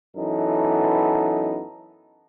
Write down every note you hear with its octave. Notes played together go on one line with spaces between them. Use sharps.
F#2 E3 B3 D#4 A4